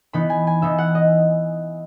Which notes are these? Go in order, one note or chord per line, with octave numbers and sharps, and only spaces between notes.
E3 B3 D#4 B5
G#5
G#5
E3 B3 D#4 E5
F#5
D#5